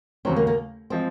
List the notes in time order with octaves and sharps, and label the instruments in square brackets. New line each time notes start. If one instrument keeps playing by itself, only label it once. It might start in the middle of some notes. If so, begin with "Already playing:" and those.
[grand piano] D#2 C#3 F#3 C#4 [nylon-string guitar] C4
[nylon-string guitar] A#3
A#3
[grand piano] F3 G#3 [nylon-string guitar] C4